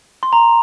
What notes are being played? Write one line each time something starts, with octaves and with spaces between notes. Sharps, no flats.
C6
A#5